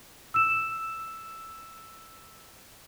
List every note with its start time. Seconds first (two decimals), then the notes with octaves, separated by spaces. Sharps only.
0.34 E6 E7